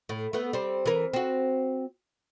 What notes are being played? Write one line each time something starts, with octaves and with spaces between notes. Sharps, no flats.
A2
A3 B3
G3 C4
E3 A#4
C4 F#4